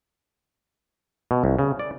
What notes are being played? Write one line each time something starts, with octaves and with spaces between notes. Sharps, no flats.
B2
C2
C#3
D5